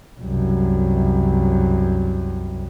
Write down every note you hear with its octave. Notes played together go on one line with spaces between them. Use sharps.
C2 F#2